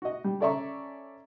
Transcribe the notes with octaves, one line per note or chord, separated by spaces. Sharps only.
F#4 D#5
G3
C#4 A4 D5 E5 A#5 C#6